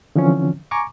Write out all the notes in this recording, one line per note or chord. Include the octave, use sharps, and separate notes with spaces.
D3 E3 F3 C4 C#4
G#5 A#5 C#6 D6